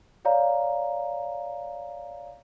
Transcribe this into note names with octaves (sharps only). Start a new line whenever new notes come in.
C#5 D5 F5 A#5